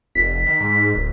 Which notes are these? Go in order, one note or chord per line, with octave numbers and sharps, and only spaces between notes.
F1 B6
D#3
G#2
D1